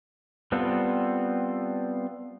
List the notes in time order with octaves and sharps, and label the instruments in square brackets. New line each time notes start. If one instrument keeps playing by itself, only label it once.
[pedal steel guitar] G3 B3 C4 F4 A4